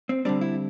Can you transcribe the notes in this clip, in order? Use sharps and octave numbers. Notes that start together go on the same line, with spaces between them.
C4
D3 G3 C4 D4
E4